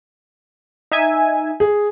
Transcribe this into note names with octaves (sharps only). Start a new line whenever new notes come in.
D#4 E5 G#5
G#4